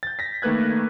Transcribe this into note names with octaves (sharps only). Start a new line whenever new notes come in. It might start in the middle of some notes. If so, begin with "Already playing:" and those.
G6 A6
A#6 B6
D#3 A3 A#3 B4 F#6 G#6